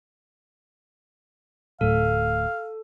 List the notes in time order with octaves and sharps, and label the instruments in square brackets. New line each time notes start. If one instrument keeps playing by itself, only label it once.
[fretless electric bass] D1 A2 [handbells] A4 [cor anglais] F5